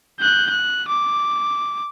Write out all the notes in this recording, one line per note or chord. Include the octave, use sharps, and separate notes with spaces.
F#6 G6
F#6
D6